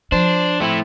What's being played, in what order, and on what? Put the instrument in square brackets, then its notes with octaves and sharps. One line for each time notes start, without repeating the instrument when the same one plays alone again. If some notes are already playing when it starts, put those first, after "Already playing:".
[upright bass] F3 [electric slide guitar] D4 [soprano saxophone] C5
[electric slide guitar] A3 E4 [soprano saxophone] C4